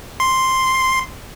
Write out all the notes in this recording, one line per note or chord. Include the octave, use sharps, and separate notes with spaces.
C6